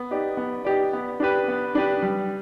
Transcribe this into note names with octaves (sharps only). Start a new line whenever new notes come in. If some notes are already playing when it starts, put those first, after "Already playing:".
Already playing: B3
D#4 G4 D5
B3
D#4 G4 D5
B3
D4 G4 B4
B3
D4 G4 B4
G3